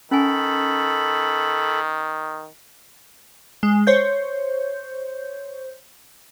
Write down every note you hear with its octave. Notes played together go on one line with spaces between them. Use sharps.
D#3 C#4 A4 G#5 B5
G#3
C5 C#5 G6